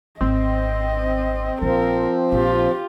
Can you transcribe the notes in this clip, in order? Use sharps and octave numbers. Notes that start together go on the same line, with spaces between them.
G#1 C4 D#5
A#1 F3 D4 A#4
A#1 F4 G4